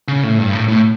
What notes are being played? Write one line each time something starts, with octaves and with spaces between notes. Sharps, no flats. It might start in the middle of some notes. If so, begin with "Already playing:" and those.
C#3
A2
G2
A2
A2